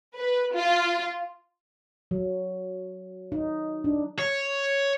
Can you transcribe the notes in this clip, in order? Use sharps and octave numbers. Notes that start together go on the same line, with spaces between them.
B4
F4
F#3
D#4
D4
C#5